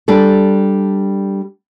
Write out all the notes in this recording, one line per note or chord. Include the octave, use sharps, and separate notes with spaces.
G3 D4 G4 A4